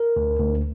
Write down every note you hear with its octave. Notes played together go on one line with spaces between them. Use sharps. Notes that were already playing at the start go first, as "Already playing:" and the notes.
Already playing: A#4
D2
D2